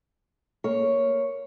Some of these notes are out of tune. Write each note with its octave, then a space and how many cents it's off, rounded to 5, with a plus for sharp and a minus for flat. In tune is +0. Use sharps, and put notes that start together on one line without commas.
A#3 +0 C#5 +0